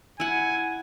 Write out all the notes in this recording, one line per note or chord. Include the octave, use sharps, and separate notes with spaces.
E4 F#5 G#5